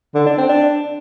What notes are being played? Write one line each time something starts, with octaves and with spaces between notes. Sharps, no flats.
D3
D4
C4
D4